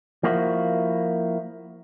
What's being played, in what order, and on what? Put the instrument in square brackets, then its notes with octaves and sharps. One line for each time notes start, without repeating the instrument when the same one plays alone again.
[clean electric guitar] F3 A#3 E4 F#4